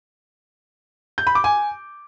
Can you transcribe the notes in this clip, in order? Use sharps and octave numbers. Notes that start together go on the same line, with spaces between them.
G6
B5
D6
G#5